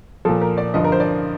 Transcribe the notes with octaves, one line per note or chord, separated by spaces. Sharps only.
A#2 F3 A4
A#4
D5
G2 D3 F3 D#5
A#4
C5
D5